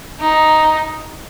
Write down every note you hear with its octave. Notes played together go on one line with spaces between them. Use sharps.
D#4